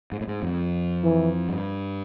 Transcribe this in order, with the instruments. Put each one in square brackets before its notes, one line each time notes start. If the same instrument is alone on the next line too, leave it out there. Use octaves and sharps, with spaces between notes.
[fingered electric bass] G#2
A2
G#2
F2
[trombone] E3
[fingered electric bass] G2